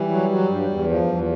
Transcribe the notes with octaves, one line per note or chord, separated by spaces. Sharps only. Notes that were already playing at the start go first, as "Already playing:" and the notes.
Already playing: E3 G3
F#3
F#3
G2
E2
F3
E2